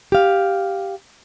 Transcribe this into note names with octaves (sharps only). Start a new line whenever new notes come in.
G4 F5